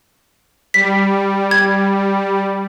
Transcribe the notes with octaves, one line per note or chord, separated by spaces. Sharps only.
G3 B6
G#6